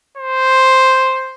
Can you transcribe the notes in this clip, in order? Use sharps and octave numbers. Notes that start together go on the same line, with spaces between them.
C5